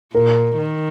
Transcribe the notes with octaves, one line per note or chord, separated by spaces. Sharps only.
A#2 A#4
D#3